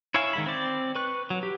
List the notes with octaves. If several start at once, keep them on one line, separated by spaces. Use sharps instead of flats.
E4 C#5 E5 F5 G#5
D#3 G#3 B5
C4 D5
B4 C#6 F#6
F#3
G4